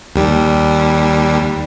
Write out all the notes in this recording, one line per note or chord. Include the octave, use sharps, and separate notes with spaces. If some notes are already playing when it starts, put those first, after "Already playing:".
D#2 G3